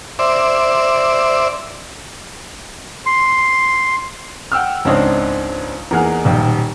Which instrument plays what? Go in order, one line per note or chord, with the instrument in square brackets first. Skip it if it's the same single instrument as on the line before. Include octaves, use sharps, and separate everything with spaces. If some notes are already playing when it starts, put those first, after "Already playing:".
[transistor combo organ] C5 D5 E5
[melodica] C6
[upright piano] F#5 G5 E6 F6
C#2 G#2 C4 D4 C#5 D#5
E2 A#3 D#4 G#4 F#5 F6
D#1 B1 G5